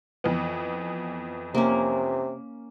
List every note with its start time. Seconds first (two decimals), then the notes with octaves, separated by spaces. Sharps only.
0.24 F2 E3 B3
1.55 C3 A#3 C#4